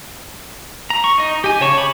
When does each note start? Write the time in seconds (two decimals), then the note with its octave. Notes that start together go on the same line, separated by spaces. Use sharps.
0.90 A#5
1.04 C#6
1.18 D#4 D#5
1.44 G4 G#5
1.61 C#3 C#5 A5 C#6
1.78 B5 C#6 D6